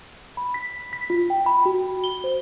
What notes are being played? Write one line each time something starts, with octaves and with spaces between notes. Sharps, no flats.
B5
B6
B6
F4
G5
B5
F#4
G7
C5